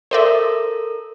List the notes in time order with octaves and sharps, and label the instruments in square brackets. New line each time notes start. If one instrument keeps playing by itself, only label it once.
[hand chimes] A4 A#4 [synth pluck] C5 D5 E5